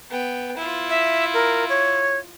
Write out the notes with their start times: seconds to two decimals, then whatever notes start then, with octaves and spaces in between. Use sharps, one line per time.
0.11 B3 G5
0.57 E4 F4
0.89 E5
1.34 A#4
1.69 C#5